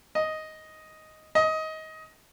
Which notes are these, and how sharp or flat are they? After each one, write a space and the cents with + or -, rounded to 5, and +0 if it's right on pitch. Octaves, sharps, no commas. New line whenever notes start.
D#5 +5
D#5 +20